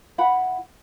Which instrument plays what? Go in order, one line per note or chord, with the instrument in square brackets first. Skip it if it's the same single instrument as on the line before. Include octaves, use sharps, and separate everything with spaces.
[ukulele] E4 F#5 B5